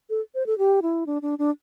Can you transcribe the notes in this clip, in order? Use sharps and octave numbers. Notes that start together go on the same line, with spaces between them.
A4
C5
A4
G4
E4
D4
D4
D4